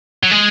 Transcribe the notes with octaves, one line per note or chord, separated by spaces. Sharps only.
F#3
G#3